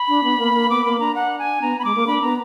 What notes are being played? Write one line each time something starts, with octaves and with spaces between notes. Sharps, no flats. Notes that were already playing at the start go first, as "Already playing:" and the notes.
Already playing: B5
D4
B3
A#3
A#3
B3 D6
A#3 B5
D4 A#5
F#5
G#5
B3 A#5
B5
G#3 D6
A#3
D4 B5
B3 A#5